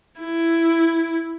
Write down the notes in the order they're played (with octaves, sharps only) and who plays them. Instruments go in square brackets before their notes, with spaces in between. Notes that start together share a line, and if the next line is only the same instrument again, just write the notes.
[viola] E4